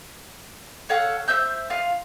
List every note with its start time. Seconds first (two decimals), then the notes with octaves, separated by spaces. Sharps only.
0.89 A4 C#5 F5 F#5
1.28 C5 E5 E6 G6
1.70 F4 F5